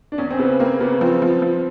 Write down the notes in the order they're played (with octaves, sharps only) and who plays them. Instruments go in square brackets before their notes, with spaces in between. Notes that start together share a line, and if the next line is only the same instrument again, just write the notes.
[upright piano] D4
[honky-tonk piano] E2 [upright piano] C#4
[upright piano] C4
[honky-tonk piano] C#3 [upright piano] B3
[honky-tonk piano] A#3 [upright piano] C4
[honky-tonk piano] C#3 [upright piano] B3
[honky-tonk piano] F3 [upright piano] C4
[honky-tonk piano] F3
F3